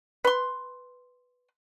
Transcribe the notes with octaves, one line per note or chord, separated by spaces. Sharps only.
B4 C6